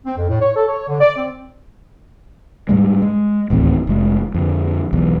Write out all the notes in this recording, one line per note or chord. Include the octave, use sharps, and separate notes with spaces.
C4
F2
A2
C#5
A4
C#5
D3
D5
C4
G#2 G3 G#3
G#3
D1 A1 D#2 C4
F1 G#3
F2 D3
B1 E2